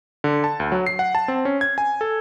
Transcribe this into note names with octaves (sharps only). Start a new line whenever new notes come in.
D3
A5
D2
F#3
C7
F#5
A5
C4
C#4
G#6
G#5
A4